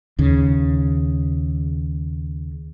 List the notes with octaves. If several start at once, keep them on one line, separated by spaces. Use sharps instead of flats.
D#2 C#3